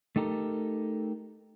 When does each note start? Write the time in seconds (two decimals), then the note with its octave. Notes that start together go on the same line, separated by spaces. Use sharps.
0.16 A3 D#4 G4 A4 A#4